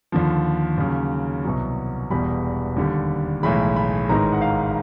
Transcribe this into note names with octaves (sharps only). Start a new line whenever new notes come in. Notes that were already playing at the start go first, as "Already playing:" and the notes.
D#2 D3 F3
D#2 C#3 F#3
C2 B2 F#3
E1 E2 B2 G3 B5
D#2 D3 G3
B1 A2 E3 G#3 B5
B5
A1 G#2 D#3 G#3 A#5
F#5
F5